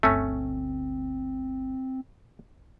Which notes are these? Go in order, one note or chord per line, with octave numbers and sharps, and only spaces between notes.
G1 D2 A3 C4 C#4